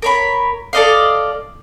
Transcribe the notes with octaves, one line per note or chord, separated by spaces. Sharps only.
A#4 C#5 B5
A4 D5 D#5 F5